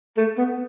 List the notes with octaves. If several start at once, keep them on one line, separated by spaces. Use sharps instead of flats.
A3
B3